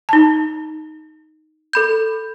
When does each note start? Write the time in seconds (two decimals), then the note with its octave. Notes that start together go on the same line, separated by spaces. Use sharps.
0.09 D#4 A5
1.73 A4 B5 G6